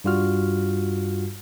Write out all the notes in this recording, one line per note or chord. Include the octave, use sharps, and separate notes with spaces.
G2 G3 F4 F#4 F6